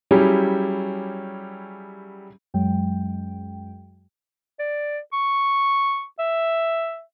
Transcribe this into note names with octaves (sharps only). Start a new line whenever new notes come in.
F#3 G3 C#4 E4 G4 G#4
F#2 F#3 G#3 G5
D5
C#6
E5